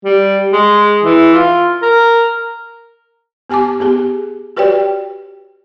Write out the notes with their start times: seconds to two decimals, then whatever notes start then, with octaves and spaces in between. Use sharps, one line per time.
0.05 G3
0.53 G#3
1.04 E3
1.34 F4
1.82 A#4
3.50 B3 G4 G#5 A5 D6
3.80 B3 G4 G#4
4.57 F#4 G4 B4 C#5 D5 G5